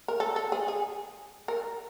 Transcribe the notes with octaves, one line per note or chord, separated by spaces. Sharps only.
A#4
A4
A4
G#4
G#4
A#4